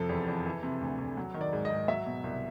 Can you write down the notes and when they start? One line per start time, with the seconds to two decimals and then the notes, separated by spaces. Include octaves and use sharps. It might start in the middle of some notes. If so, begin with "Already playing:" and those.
Already playing: F2 C3 F3 A4
0.09 E2
0.28 E2
0.46 E3
0.63 C3
0.81 D2
0.99 D2
1.17 F#3
1.34 D#3
1.41 D5
1.53 G#2
1.65 D#5
1.70 G#2
1.88 F#3 E5
2.06 B2
2.24 C2